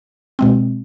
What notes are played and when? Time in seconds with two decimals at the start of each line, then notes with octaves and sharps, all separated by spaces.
0.39 B2 G#3 C4